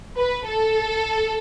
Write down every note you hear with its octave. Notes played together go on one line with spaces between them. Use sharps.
B4
A4